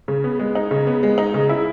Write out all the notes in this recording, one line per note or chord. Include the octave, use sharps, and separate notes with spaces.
C#3
B3
G#3
D#4
C#3
B3
G#3
D#4
C#3
E4